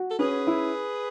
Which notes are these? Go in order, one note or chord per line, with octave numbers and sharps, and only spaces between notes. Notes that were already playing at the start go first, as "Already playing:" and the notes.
Already playing: F#4
A4
C#4 G#4 B4
E4